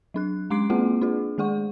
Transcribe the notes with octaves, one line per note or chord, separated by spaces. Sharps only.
F#3 D4 F#6
G#3 C#4 C6 D6 C7 D7
A#3 C4 F4 G#4 F#5
D4 F4 G#4
D#3 G#3 G#4 F#5 C#6